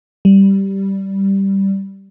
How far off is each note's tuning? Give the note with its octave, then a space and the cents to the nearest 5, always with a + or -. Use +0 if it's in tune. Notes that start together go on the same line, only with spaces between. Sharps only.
G3 -5